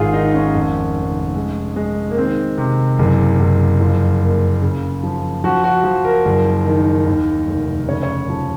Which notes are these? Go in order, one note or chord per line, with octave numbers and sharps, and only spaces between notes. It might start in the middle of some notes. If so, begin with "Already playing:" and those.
Already playing: G#1 F4 G#4
D#3 D#4
C#4
F2
F1
G#3
G#3
A#3
D#3 C4
C3
F#1
F#1
F2 F4
A#3
C#3
F3
F3 F#4
F#4
F3
A#4
F#1
D#3
D#2
F1
C#3 C#5
C#5
F3